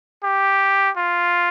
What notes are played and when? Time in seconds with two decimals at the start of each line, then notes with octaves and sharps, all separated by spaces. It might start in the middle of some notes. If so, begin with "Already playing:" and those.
0.24 G4
0.97 F4